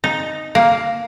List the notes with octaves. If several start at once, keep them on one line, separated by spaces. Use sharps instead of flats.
D#4
A#3